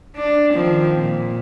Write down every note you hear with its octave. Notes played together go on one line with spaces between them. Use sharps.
D4
D#3 F3 C4
A#2